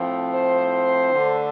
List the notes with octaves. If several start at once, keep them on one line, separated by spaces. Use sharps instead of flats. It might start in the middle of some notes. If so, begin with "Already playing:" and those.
Already playing: A2 F3 C4
C5
D3 A3 D4